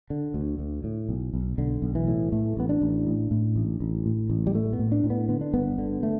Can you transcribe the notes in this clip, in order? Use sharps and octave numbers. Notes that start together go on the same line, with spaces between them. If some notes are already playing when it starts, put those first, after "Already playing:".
D3
D2
D2
A2
B1
B1
B1 D3
B1
E3
A2
A2 A3
A1 B3
D4
A1
A2
A2
A1
A1
A2
A1
G3
A2 A3
B3
A2
D4
A2
B3
D3 B3
D4
G1 B3
D3
A3